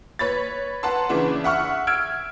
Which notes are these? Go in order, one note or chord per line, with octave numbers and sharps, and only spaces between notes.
B4 C#5 B5 A6
B4 F#5 A5 A#5 C6
C#3 E3 D4 B4
E5 F#5 C#6 F6
E6 F6 G#6 D7